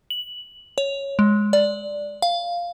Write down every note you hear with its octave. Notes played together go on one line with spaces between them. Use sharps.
F#7
C#5
G#3
D5
F5